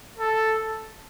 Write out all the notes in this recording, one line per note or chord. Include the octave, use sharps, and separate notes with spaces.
A4